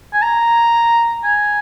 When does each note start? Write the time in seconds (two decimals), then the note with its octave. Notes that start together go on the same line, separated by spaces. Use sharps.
0.13 G#5
0.22 A#5
1.24 G#5